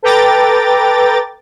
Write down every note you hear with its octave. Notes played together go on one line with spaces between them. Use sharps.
A4 B4 G5 A#5 D6 A6